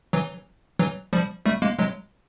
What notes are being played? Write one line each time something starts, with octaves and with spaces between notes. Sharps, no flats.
E3 F#3
E3 F#3
F3 G3
G3 A3
G#3 A#3
F#3 G#3